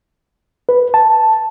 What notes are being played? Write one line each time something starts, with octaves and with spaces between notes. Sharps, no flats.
B4
A5